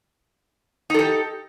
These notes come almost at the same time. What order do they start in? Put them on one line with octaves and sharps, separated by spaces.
D#4 A4 G4